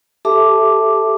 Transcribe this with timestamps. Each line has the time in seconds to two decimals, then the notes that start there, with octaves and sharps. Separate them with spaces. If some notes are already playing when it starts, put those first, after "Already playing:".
0.25 G4 A4 E5 A5 D6